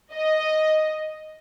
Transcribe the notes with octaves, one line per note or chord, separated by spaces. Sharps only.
D#5